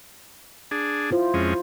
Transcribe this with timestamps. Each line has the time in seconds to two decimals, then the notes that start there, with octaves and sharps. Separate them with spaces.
0.71 D4 G#4
1.11 E4 F4 C5
1.34 F2 G#3 C#4